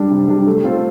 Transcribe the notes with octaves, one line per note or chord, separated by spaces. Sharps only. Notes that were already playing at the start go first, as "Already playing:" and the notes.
Already playing: G3 D4
C3
G3 D4
A3
C4 F4 A4 C5